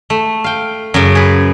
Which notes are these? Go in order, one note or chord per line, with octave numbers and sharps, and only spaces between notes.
A3
F5 G5
F#2 C#3
G#4 B4